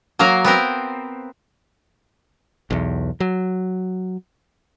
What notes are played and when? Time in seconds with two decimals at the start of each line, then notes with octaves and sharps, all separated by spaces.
0.19 F#3 A#3 A#4 F5
0.44 B3 C4 A#4 C5
2.70 B1 E2
3.20 F#3